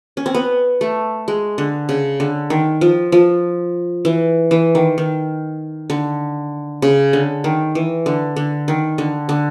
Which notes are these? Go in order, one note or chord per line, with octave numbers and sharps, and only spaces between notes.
C#4
C4
B3
A3
G#3
D3
C#3
D3
D#3
F3
F3
E3
E3
D#3
D#3
D3
C#3
D3
D#3
E3
D3
D3
D#3
D3
D3